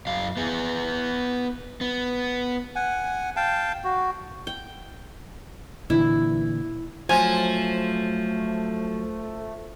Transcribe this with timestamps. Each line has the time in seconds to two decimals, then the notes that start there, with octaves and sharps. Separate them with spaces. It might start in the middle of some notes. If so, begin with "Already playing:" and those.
0.07 F#2 F5
0.37 B3 G#4
1.81 B3
2.76 F#5 G#5
3.36 F5 G5 A5
3.84 F#4
4.47 G5
5.90 A#2 D3 E3 E4
7.09 F3 F#3 A3 G#5